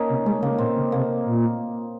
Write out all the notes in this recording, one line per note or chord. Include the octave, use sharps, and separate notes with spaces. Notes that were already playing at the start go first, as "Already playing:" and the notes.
Already playing: A#3 C#4 D#4
C3
G#3 C#4
C#3 A#3
A#2 C4
C#3
C3 A#3
A#2